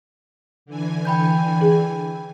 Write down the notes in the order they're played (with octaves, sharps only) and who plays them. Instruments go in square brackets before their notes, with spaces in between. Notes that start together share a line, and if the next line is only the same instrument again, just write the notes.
[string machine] D3 E3 G#5
[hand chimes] G5 B5 G6
[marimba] G#4